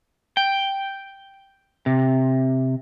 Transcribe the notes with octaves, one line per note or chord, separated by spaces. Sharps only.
G5
C3